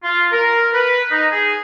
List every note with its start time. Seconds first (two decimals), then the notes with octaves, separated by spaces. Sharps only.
0.03 F4
0.31 A#4
0.72 B4
1.11 D#4
1.31 G#4